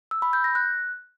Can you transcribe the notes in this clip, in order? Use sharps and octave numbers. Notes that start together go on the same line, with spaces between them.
E6
B5
G6
A#6
F#6